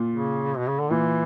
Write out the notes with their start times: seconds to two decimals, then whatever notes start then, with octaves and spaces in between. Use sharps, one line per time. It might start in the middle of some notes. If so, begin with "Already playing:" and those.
Already playing: A#2
0.10 C#3
0.57 B2
0.67 C#3
0.80 D3
0.90 A#2 E3